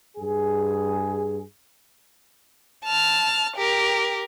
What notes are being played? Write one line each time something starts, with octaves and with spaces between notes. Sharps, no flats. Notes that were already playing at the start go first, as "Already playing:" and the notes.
G2 G#4
A5 F6
G4 A#4